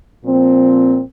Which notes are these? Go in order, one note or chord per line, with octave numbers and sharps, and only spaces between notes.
A#2 F3 C4